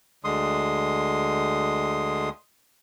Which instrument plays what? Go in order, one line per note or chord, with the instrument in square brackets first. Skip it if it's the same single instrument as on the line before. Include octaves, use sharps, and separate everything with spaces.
[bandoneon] D2 D3 G#3 C6 D#6